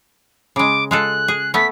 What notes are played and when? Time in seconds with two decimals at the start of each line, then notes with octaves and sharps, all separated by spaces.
0.56 C#3 G#3 D6
0.91 G#3 F4 A4 F#6
1.28 G#4
1.54 A3 B3 B6